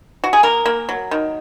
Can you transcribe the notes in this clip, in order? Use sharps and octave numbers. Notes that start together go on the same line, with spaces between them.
F#4
G#4
A#3 A#4
A#3
F#3
D#3